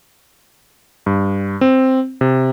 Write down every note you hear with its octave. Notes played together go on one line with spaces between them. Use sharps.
G2
C4
C3